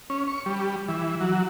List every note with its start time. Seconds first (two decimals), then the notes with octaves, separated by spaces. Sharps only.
0.10 C#4
0.28 C#6
0.46 G3
0.88 E3
1.20 F#3